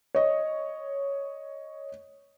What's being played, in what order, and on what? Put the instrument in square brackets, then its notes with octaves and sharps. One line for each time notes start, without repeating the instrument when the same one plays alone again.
[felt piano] C#5 D#5